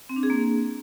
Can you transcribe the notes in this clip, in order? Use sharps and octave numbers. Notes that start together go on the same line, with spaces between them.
C4
D4
G#4
A#3